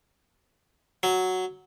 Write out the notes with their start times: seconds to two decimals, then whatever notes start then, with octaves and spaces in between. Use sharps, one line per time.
1.03 F#3